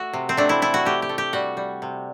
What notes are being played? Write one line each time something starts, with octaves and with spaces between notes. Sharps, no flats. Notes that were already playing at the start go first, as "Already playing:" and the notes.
Already playing: A3 F#4 E5 F#5
C3
C4
A3 D4
E4
A3 E4
F#4
A3 G4
G4
A3
G4
G3 F#4
G3
C3